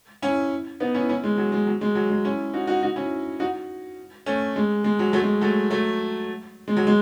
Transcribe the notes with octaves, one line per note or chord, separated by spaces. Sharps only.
C#4 E4
B3 D#4
C#4 E4
C#4 E4
G#3
F#3
G#3
F#3
G#3
F#3
G#3
C#4 E4
D#4 F#4
D#4 F#4
D#4 F#4
C#4 E4
D#4 F#4
A3 C#4
G#3
G#3
F#3
F#3 A3
G#3
F#3 A3
F#3 A3
G#3
F#3
G#3